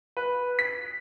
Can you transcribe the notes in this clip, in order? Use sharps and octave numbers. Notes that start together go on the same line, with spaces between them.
B4
B6